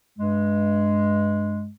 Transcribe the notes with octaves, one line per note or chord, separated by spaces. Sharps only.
G2 G#3